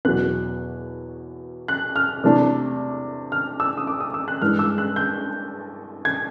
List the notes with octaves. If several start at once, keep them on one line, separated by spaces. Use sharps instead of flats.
E2 B2 F#3 F#6
F#6
F6
C3 E3 A3 D4
F6
E6
D#6
D6
D#6
E6
F#6
G2 E3 G#3 F6
E6
F#6
G6
G#6